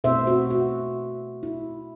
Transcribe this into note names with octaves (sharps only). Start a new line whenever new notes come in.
B2 A3 C4 E4 C5 E5
F#4
F#4
E4